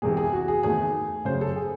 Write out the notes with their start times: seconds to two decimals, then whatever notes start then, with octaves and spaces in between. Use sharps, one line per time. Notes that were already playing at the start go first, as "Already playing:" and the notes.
0.02 E1 E2 C3 E3 G#4
0.17 G#4
0.33 F#4
0.48 G#4
0.63 F#1 E2 D#3 A3 G#4
1.25 F#2 C#3 F#3 A3 C5
1.41 A4
1.56 G#4